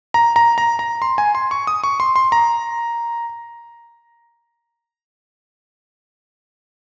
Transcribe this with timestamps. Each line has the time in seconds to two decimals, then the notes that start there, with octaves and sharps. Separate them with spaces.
0.14 A#5
0.36 A#5
0.58 A#5
0.79 A#5
1.02 C6
1.18 G#5
1.35 C6
1.51 C#6
1.67 D#6
1.84 C#6
2.00 C6
2.16 C6
2.32 A#5